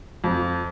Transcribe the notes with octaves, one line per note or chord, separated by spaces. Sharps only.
F2